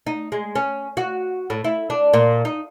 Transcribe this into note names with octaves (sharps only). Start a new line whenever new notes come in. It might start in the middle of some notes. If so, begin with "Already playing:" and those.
D#4
G#3
C#4
F#4
A2
E4
D4
A#2
D#4